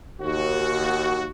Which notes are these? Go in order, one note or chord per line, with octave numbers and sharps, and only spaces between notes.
D#2 F#4